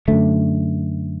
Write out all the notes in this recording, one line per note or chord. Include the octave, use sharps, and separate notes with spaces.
F#2 D3 A3